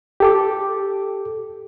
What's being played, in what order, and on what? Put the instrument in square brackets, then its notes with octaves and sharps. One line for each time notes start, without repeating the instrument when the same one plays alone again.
[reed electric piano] G4 A4 D6